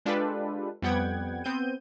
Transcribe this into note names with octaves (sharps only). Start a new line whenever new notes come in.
G#3 D4 F4 G4 A4 B4
F2 G3 B3 F#5 G5 G#6
B3 C4 G6 D#7